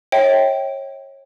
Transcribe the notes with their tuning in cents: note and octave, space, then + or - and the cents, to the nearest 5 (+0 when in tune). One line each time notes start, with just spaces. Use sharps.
C#5 -25 E5 -45 G5 -10